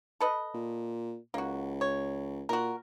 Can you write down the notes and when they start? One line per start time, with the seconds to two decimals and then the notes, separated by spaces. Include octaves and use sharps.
0.20 A4 B4 D#5
0.54 A#2
1.34 C#2 A#3 F#4
1.81 C#5
2.49 A#2 F#4 A#4